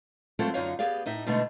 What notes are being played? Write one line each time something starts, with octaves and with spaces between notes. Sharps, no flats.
F#3 G#3 A3 C4 F4 A4
F#2 D3 D#4 F4 C#5 F5
B3 G4 G#4 D5 F5
A2 D#4 E5
B2 D3 G#3 A3 D#4